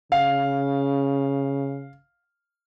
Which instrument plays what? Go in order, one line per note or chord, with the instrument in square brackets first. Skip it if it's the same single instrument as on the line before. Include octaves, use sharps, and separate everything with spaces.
[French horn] C#3 [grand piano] F5